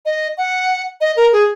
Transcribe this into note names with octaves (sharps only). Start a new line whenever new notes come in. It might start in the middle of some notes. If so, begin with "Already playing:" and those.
D#5
F#5
D#5
A#4
G#4